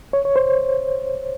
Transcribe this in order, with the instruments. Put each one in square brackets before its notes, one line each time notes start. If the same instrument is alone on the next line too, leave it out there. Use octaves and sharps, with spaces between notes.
[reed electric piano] C#5
C#5
C5